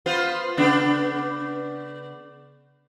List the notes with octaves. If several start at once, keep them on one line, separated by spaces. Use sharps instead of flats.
B3 F4 C5
C#3 B3 D4